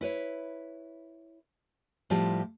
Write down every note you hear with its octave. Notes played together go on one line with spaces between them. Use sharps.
E4 B4 C#5
A2 F3 G3 F4 G4 A5